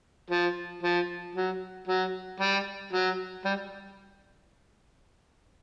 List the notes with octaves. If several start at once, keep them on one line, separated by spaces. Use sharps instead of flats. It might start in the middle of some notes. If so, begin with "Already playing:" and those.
F3
F3
F#3
F#3
G3
F#3
G3